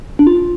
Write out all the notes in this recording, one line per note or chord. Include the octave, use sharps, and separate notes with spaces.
D4
F4